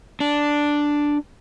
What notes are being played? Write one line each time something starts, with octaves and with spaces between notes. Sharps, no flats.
D4